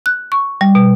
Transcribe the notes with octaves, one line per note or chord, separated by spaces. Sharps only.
F#6
C#6
G3
B2